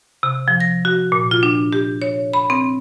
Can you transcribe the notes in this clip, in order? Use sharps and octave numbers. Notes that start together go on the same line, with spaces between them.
C3
F3
A#6
F#4
A#2
F4
D4
G4
C#5
B5
C4